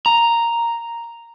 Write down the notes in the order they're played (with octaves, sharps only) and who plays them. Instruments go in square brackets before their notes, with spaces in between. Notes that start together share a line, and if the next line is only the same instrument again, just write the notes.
[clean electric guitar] A#5